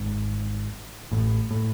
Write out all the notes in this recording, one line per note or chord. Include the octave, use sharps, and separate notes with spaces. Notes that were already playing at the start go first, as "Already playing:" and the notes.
Already playing: G#1 G#2
A1 A2
A2